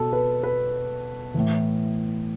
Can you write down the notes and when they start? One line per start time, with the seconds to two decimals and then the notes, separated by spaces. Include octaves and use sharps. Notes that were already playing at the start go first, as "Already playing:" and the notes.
Already playing: B2 A4
0.13 B4
0.43 B4
1.34 A2 E3